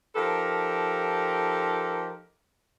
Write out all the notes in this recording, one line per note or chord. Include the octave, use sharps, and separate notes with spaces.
F3 D#4 G4 A4 A#4